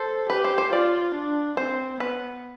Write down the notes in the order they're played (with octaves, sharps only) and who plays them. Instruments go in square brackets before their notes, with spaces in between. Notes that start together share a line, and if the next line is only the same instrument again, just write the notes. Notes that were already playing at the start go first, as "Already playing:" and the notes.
Already playing: [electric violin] A4 [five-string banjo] C5
[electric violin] G4 [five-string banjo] B4
[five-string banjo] C5
C5
[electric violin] F4 [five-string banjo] D5
[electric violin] D4
[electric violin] C4 [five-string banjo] C5
[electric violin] B3 [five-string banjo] B4